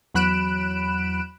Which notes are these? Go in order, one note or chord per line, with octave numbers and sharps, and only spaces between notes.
E2 F#3 B5 F#6 D7 E7